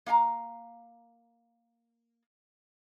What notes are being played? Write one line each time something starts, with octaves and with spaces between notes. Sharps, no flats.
A#3 F5 G5 A#5